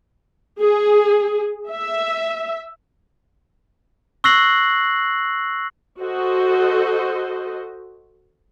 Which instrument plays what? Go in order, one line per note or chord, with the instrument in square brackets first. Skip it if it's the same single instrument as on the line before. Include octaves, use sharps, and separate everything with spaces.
[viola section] G#4
E5
[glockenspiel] C#6 E6 F#6 A#6 C7 F#7
[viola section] F#4 A4 C5 D#5